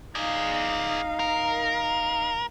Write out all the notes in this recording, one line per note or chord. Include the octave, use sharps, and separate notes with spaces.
D#4 G#4 D5 F5
A#4